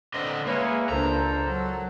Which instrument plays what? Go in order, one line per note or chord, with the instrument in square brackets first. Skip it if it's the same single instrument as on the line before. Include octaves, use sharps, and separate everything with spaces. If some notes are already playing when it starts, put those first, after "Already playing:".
[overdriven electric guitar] D3 D#5 [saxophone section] B3 C4 D4
[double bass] G#3 [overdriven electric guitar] A#3 [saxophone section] C#4 C#5 [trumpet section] E4 G#4 B4
[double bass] C#2 D4 [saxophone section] A4 [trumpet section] A#4 C5 [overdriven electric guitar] A#5
[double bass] F#3